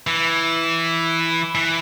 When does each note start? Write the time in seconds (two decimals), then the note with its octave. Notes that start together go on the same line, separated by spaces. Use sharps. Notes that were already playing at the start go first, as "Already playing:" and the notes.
0.07 E3
1.55 E3